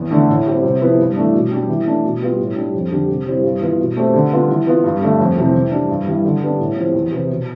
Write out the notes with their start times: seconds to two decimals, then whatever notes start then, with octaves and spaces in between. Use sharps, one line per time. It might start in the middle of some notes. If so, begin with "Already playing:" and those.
Already playing: E2
0.11 D3 A3 D4
0.28 A2
0.46 G3 C4 G4
0.63 C3
0.82 F3 B3 E4
0.99 G2
1.16 E3 A3 D4
1.34 B2
1.51 G3 D4 G4
1.68 E3
1.86 A3 D4
2.04 B2
2.21 G3 B3 F4
2.39 A2
2.56 G3 D4 G4
2.74 F2
2.91 D3 G3 D4 G4
3.09 C3
3.26 G3 C4 E4 G4
3.44 G2
3.61 E3 B3 F4
3.79 B2
3.96 A3 C4 G4
4.14 D3
4.32 G3 B3 F4
4.49 E3
4.67 B3 F4
4.84 G2
5.01 D3 A3
5.19 F2
5.37 C3 E3 G3
5.54 E3
5.71 G3 D4
5.89 G2
6.06 E3 G3
6.24 D3
6.41 G3 B3 D4
6.59 A2
6.76 F3 C4 E4 G4
6.94 E2
7.12 C3 E3 B3
7.29 B2